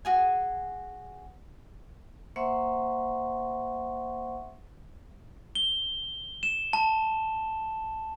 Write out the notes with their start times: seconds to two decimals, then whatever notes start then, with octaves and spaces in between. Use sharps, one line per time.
0.05 F#4 G#4 G#5
2.36 A#3 C5 E5 F#5 C6 C#6
5.55 G7
6.43 E7
6.73 A5